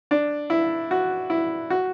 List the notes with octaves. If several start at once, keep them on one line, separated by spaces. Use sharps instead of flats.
D4
E4
F#4
E4
F#4